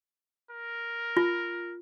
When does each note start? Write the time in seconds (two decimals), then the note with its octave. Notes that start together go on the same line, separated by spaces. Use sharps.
0.50 A#4
1.17 F4